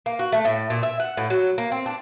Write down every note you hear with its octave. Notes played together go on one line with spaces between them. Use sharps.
A#3
F#4
A3
A2
A#2
E5
F#5
A2
F#3
A#3
C4
D4